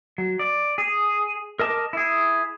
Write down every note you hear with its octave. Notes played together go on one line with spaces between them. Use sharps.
F#3
D5
G#4
A#4 D#5 A5 D6 F6
E4 G#4